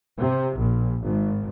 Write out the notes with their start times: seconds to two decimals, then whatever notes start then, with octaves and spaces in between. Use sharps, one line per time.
0.18 C3
0.56 A#1
1.03 G#1